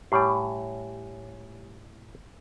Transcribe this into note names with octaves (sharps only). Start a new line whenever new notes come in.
A2 G3 G4 C#5 G#5